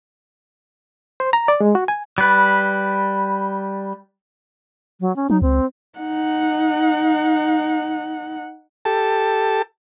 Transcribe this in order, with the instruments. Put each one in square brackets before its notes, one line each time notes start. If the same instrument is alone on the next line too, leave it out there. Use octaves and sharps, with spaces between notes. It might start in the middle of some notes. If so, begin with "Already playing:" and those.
[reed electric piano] C5
A#5
D5
G#3
F#4
G#5
[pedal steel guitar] G3 B4
[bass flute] F#3
C#4
[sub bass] F#3 [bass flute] D#4
[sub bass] C#2 [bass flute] C4
[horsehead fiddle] D#4 F#5
[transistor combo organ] G4 A4 A5